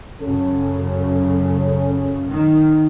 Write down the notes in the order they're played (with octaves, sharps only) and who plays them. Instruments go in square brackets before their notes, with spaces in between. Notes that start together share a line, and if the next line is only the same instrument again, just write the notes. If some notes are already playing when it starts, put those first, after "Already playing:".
[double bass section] F#2 C#3 [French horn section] C#4 A4
[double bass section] D#3